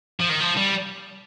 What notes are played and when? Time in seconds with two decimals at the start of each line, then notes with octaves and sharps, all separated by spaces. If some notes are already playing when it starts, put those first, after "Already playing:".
0.20 F3
0.29 D#3
0.40 F3
0.57 G3